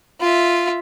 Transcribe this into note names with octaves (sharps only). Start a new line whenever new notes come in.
F4 E5